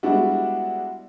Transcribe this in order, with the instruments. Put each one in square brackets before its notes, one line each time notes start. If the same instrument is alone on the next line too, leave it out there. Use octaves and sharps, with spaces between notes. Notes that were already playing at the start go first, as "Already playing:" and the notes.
[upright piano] G3 G#3 B3 D4 E4 F#4